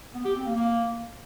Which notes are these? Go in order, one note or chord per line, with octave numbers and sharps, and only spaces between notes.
B3
G4
C4
A#3
A#3